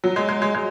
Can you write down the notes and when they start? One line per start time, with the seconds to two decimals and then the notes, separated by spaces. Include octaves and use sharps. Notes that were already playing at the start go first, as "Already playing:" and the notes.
0.04 F#3
0.16 G#3
0.29 G#3
0.42 G#3
0.54 G#3